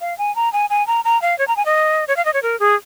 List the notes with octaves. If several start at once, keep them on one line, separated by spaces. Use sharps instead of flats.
F5
G#5
A#5
G#5
G#5
A#5
A#5
F5
C#5
A#5
G#5
D#5
C#5
F5
D#5
C#5
A#4
G#4